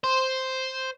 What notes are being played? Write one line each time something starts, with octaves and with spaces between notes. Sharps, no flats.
C5